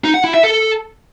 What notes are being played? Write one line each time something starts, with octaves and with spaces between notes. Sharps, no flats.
D#4
F#5
E4
E5
A4